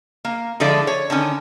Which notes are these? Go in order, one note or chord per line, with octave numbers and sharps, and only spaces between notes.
A#3
D3 F3 G#3 E4 A4 D5
C#5
D3 D#3 C#4